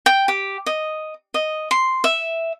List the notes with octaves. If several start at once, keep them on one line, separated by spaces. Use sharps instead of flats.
G5
G4
D#5
D#5
C6
E5